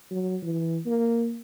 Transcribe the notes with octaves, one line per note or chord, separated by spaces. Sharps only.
F#3
E3
A#3